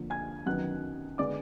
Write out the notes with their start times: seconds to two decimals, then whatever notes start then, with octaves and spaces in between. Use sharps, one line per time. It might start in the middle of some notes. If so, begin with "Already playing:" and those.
Already playing: F2 D3 F3 A#3
0.10 G#5 G#6
0.46 F#2 D#3 F#3 B3 F#5 F#6
1.18 D3 G#3 B3 D5 D6